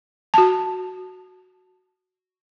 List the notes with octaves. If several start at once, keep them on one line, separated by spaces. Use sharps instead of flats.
F#4 A5